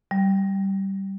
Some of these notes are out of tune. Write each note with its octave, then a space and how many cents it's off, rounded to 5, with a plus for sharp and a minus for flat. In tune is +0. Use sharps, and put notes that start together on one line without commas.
G3 -15